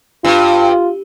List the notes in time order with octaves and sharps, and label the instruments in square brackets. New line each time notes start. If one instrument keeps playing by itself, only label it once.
[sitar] G2 [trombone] F4